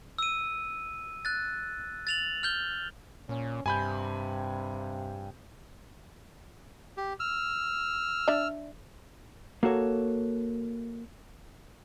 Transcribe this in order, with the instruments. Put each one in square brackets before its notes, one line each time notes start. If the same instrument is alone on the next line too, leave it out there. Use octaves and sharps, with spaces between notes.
[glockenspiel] E6 D#7
F#6 A6
A6 F7 F#7
F6 G6 G7
[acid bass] A#2 [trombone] C#4
[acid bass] G2 [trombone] C3 [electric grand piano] G#5 B5 G6
[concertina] G4
E6 F6
[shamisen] D4 D5 E5
[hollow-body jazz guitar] A#3 F#4 A4 C#5